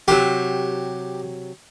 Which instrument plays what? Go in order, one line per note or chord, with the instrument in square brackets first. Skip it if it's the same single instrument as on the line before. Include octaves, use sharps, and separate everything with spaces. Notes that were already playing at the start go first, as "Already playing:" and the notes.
[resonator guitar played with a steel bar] C3 F#3 [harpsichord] G4